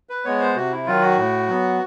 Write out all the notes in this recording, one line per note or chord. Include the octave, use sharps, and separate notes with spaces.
B4
G#3 B3 C#5
C5
C3 F#4
E4
D#3 F#3 F4
F#4
A2
F#3 B3